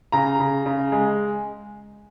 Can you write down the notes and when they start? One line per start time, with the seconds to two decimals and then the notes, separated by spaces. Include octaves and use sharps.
0.12 C#3 A#5
0.40 C#3
0.66 C#3
0.92 G#3